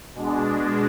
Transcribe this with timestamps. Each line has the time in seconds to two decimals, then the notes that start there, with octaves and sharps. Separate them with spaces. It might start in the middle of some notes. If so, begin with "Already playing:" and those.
0.15 B2 G#3 D4